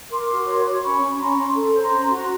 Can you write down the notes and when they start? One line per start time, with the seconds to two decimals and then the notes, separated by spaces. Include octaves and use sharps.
0.11 A#4 C6 D6
0.29 F#4
0.47 C#5
0.65 C#5
0.83 C#4 B5 C#6
1.01 C#4
1.19 C#4 A#5 C6
1.38 C#4
1.55 A4
1.74 C5
1.80 A#5 C6
1.91 C#4
2.03 A#5 C6
2.09 F#4